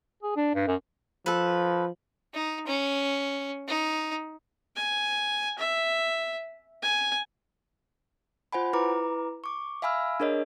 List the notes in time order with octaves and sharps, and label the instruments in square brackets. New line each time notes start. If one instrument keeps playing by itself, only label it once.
[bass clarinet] G#4
D4
G2
F#2
[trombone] F3 [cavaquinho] A4 B4
[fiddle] D#4
C#4
D#4
[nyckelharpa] G#5
E5
G#5
[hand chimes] F4 C5 F#5 G#5 B5
E4 B4 A#5 D6
C#6 D6
E5 F5 G#5 B5 E6 F6
D4 G#4 A#4 C#5 D#5